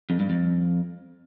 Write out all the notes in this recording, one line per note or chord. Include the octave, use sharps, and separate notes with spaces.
F2
G2
F2